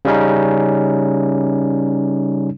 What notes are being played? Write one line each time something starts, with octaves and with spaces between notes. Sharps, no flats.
C#3 G3 C#4 D#4